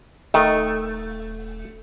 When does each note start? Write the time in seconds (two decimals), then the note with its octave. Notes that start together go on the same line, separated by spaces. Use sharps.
0.34 D#1 D#3 A3